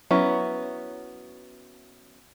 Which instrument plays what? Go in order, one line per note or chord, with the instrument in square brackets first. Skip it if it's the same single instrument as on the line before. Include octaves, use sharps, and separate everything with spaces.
[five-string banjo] F#3 B3 C#4 E4